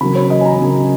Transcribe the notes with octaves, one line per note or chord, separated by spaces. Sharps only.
C#3 F#3 A#3 B5
C#5
D#5
G#5
A#5
C#3 F#3 A#3